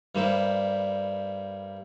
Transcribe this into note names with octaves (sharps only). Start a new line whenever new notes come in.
G2 G3 A#3 E4 C5